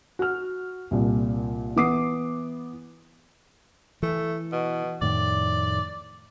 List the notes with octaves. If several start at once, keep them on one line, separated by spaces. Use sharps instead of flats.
F#4 F6
C2 A#2
E3 B3 D6 D#6 C7
E3 A3
B2
F2 A2 D#3 D5